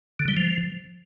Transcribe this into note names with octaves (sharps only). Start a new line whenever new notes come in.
D3
G3
F3